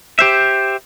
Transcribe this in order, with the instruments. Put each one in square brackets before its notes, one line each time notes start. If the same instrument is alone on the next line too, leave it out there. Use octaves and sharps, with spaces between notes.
[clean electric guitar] G4 C5 E5